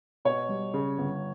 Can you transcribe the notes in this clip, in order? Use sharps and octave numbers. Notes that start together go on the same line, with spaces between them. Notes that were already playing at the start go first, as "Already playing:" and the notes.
B2 C#5
G3
C#3
G1